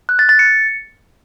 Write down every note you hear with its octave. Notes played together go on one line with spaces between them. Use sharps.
F#6
A6
A6
C#7